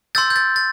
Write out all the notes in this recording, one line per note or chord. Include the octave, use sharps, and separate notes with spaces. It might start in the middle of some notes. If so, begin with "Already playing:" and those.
C6 E6 G6 A6
G6
A6
A6